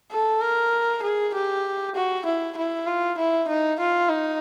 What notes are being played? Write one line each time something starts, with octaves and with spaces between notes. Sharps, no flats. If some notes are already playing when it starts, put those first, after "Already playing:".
A4
A#4
G#4
G4
F#4
E4
E4
F4
E4
D#4
F4
D#4